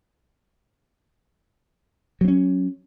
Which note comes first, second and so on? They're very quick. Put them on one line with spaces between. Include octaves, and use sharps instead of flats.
F#3 C4 C#4